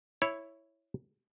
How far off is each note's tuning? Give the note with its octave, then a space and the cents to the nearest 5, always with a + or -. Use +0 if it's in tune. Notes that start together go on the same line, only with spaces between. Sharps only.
E4 +0 C#5 +0